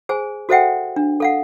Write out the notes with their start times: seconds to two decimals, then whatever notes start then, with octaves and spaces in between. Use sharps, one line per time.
0.09 G#4 C5 G#5
0.49 F#4 A4 C5 E5 F#5 G5
0.96 D4
1.20 A4 F5 F#5